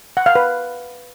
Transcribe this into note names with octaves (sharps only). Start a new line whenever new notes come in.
F#5
F5
B4